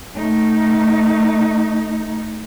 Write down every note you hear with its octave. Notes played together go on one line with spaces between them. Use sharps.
A3 D#4